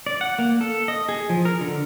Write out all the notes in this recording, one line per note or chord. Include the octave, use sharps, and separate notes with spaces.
D5
F#5
A#3
A4
D#5
G#4
F3
A#4
D3